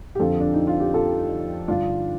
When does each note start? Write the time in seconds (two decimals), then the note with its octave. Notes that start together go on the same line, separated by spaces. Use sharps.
0.15 G4
0.20 F2 D3 F4 A4
0.40 D4
0.54 D#4
0.67 F4
0.80 G4
0.94 F4 A4
1.68 G2 D3 D4 F4